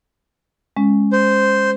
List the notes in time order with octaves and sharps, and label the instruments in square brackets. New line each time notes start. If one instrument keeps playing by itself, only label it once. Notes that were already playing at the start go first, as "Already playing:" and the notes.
[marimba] G#3 C#4
[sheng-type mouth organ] C5